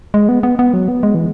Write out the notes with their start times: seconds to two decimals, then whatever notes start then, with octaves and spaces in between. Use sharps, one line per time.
0.14 G#3
0.29 B3
0.43 B3
0.59 B3
0.74 F#3
0.88 B3
1.03 G#3
1.15 E3